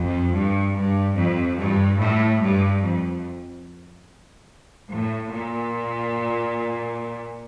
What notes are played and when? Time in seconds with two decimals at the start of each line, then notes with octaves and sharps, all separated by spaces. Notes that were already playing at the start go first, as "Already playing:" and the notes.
Already playing: F2
0.34 G2
0.75 G2
1.16 F2
1.58 G2
1.99 A2
2.41 G2
2.82 F2
4.90 A2
5.31 A#2